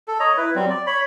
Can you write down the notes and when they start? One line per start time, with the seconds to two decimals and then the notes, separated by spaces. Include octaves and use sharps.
0.08 A4
0.20 C#5 D#5 A#5
0.37 E4 B4
0.55 F#3 G3 C4
0.70 D5
0.87 C#5 B5